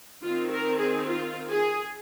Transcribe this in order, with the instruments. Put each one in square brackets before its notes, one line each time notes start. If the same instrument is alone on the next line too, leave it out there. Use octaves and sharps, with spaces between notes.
[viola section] D#3 C4 F4
A#4
G#4
F4
G#4